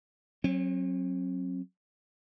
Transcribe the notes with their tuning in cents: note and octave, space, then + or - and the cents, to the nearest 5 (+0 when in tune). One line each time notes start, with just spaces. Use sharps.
F#3 +0 C4 +45